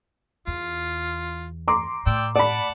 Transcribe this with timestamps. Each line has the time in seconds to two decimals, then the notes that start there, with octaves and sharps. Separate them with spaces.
0.47 E2 F4
1.68 A#5 C6 D6
2.06 A2 D5 G5 E6
2.36 D5 F#5 A5 B5